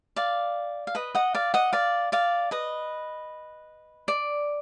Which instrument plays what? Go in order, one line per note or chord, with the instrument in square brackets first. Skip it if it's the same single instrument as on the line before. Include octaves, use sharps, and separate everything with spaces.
[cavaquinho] D5 F5
F5
B4 D#5
D#5 F#5
D5 F5
D#5 F#5
D5 F5
D5 F5
B4 D#5
D5